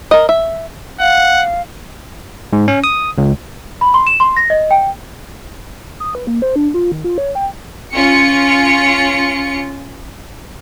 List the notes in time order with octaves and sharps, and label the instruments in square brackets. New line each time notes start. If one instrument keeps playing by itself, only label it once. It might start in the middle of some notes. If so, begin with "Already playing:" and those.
[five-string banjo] A#4 D#5
E5
[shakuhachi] F5 [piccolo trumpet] F#5
[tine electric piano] G#2
C#4
D#6
C#2
[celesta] B5
C6
E7
C6
A#6
D#5
G5
[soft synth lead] D#6
B4
A#3
C5
D4
F4
D#3
F4
C#5
G5
[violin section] C#4 F4 C#7